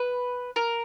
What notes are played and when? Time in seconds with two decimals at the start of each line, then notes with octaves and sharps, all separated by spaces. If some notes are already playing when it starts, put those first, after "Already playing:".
Already playing: B4
0.56 A#4